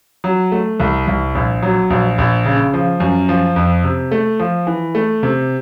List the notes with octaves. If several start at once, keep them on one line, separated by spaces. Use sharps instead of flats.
F#3
A3
C2
C2
A#1
F#3
A#1
A#1
C#3
F3
F#2
F3
F2
C3
A3
F3
E3
A3
C3